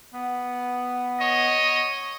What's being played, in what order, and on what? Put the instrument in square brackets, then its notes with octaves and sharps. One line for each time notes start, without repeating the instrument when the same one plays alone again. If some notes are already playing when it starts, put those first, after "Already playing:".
[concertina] B3
[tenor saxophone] C#5 [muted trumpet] D#5